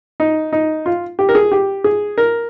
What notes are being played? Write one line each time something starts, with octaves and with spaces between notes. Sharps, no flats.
D#4
D#4
F4
G4
A#4
G#4
G4
G#4
A#4